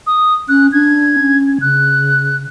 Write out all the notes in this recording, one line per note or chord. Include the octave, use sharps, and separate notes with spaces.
D#6
C#4 F#6
D4 G#6
C#4
C#3 F#6